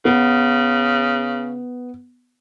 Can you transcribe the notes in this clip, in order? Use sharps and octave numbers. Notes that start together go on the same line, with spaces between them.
C#3 B3